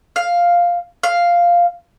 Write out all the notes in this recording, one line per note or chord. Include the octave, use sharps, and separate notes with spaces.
F5
F5